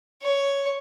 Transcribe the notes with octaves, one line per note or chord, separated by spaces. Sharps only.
C#5